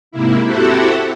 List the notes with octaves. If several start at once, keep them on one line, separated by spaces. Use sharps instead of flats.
G#2 C3 A#3 E4
C4 E4 F#4 G4 A4 F#5